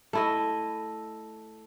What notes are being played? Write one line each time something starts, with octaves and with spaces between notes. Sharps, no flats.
A3 E4 D#5